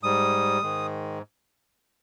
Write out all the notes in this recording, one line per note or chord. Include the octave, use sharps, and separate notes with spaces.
G#2 G3 D#6
G#2 D#3 G#3